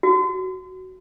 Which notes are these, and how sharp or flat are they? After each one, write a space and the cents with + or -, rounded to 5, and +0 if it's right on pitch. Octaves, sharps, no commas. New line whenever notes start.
F#4 +10